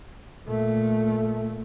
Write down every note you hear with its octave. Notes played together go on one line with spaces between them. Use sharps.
A#2 A3